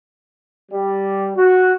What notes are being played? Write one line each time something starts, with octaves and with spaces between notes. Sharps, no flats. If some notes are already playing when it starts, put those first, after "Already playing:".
G3
F#4